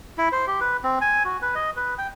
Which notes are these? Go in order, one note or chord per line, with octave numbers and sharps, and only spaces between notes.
E4
C5
G4
B4
C4
G#5
F#4
B4
D#5
B4
G5